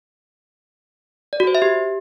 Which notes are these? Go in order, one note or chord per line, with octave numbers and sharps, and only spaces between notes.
D5
F#4
C5
E5
G4